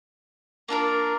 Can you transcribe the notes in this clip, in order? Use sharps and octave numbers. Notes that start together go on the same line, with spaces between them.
A#3 D4 F4 A#4